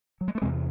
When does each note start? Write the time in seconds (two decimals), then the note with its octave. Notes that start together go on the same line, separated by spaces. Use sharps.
0.21 F#3
0.28 G#3
0.35 A3
0.42 E2 C3 G#3 C4